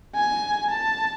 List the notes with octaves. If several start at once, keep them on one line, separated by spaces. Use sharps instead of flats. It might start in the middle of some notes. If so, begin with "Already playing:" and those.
G#5
A5